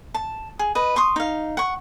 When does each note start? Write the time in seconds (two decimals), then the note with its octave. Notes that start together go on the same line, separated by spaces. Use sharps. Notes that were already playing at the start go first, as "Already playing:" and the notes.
0.14 A5
0.59 G#4
0.75 B4 D#5
0.96 C6 C#6 D#6
1.16 D#4 F5
1.57 F#5 C#6